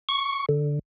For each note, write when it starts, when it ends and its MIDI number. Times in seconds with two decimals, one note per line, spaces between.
0.09 0.46 85
0.49 0.79 50